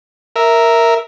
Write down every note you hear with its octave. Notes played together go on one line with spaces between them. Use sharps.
A#4 E5